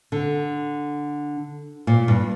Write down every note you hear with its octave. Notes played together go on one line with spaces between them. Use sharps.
D3
A#2
G2